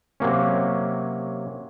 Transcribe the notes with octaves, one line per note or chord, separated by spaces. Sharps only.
C3 F#3 A#3 C#4